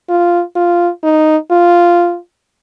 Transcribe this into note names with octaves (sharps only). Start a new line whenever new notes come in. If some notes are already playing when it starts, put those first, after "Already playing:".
F4
F4
D#4
F4